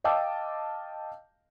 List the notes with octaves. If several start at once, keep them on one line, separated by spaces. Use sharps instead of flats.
D#5 F5 G5 A5 D6 E6